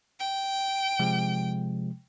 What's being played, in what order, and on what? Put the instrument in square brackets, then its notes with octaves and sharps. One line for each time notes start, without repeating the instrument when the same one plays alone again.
[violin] G5
[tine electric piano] C3 F3 G#3